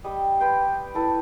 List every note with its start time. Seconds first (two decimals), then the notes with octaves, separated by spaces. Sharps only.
0.04 G3 D#5
0.40 B4 G5 C6
0.95 E4 A4 B4